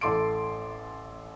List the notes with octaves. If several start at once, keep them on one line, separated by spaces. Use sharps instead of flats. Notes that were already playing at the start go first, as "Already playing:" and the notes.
A1 E4 A4 C6 D6 D7